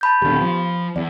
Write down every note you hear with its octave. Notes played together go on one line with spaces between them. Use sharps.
A5 B5 G6
D#1 D3 B3 G4
F3 B5
E2 D5